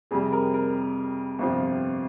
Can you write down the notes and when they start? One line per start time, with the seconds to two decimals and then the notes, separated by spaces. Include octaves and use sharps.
0.11 F2 C3 G3 G#4
0.32 A#4
0.54 A#4
1.39 G1 F2 C3 F3